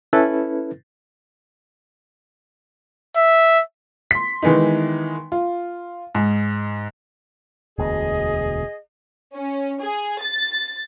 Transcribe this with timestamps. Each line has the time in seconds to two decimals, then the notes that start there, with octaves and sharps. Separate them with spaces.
0.13 C#4 E4 A4 B4
3.16 E5
4.11 C6 B6
4.43 D#3 E3 G#3 B3 D#4
5.32 F4
6.15 G#2
7.79 E1 D2 B2 G#4 D#5
9.35 C#4
9.82 G#4
10.24 A6